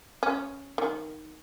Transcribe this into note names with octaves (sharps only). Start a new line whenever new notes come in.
C#4
D#3